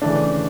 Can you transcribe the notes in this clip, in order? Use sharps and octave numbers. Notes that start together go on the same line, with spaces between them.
C#3 E3 A3 D4